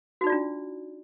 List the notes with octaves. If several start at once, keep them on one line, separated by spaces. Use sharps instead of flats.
D4 D#4 F4 F#4 D5